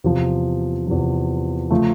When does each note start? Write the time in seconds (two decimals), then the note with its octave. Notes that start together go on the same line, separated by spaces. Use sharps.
0.04 E2 C3 F3
0.87 E2 C3 F3
1.70 C#3 F3 A3